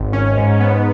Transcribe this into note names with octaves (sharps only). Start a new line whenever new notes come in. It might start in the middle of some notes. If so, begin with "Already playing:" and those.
Already playing: G#1
C#4
G#2
B3